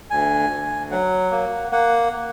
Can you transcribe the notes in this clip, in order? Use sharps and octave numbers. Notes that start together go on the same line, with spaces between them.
D2 G#5
D2
F#3 F#5
A#3
A#3 F#5
A#3